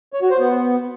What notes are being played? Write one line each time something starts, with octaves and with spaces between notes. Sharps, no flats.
C#5
F#4
C5
B3